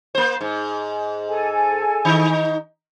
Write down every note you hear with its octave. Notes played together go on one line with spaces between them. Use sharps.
A#3 C5
G#2
A4 G#5
D#3 D#4